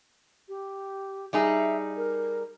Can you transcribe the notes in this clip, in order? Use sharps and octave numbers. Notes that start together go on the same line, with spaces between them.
G4
G3 D#4 G#4 E5
A#4